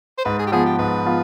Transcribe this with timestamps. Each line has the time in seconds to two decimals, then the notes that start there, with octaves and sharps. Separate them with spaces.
0.18 C5
0.25 G#2 B4
0.39 G#4
0.47 G4
0.52 F3 B3 F4 G#4
0.66 G4
0.79 G#2 B4
1.05 F3 B3 F4